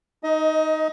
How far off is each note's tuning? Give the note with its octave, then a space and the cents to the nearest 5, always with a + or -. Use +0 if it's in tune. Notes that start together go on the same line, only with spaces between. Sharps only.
D#4 +0 D#5 +25